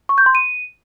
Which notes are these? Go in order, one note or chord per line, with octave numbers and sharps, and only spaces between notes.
C#6
G6
C6
D#7